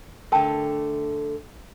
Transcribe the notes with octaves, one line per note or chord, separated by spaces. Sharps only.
D3 A3 A#4 G5 A5